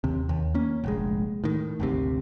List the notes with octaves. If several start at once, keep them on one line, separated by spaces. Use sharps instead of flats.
D#2 C3
D#2
A#3 C#4
F1 A#1 G#3
A2 D#3
G#1 D2 C3